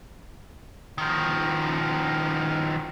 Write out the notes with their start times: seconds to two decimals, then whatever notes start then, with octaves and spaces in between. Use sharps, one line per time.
0.98 D#3 F3